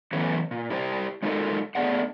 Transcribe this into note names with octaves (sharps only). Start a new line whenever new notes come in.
E3 F#3 A3 B3 C#4 F#4
A#2
E4 G4 C5 G5
G#3 D#4 F4 F#4 A4 A#4
A3 B3 D4 G#4 F#5